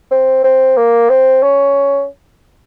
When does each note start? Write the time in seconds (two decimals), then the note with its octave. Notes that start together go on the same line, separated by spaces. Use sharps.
0.11 C4
0.44 C4
0.77 A#3
1.09 C4
1.43 C#4